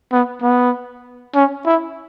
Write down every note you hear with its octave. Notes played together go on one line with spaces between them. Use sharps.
B3
B3
C#4
E4